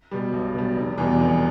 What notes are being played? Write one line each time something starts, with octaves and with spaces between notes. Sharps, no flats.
B2 G3
B1
B2 G3
F1
E2 B2 G3
F1